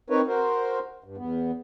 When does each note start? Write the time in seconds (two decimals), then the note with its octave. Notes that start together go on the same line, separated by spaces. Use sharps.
0.10 C4 D#4 A#4 B4 C#5
0.27 F#4 A#4 C5
1.04 G2
1.17 E2 B3